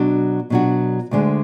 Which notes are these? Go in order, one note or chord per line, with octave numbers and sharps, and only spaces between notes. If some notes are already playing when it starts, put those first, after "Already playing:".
Already playing: B2 F#3 D4 F#4
B2 F#3 D4 F#4
D2 D3 G#3